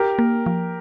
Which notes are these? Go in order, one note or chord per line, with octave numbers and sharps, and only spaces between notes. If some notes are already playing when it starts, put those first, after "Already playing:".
Already playing: G4 A#4
A#3
F3